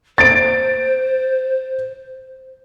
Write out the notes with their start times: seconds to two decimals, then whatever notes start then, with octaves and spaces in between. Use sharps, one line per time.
0.18 C5 A6 D7